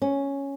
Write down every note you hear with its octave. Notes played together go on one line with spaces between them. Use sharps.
C#4